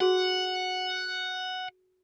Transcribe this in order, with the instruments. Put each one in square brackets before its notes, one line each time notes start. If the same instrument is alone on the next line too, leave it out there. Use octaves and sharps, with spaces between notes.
[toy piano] F#4 G#4 [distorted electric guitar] F#5